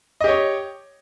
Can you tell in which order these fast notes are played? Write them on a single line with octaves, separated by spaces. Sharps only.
D#5 G4 C#5